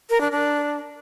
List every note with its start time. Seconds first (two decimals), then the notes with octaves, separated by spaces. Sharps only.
0.10 A#4
0.21 D4
0.31 D4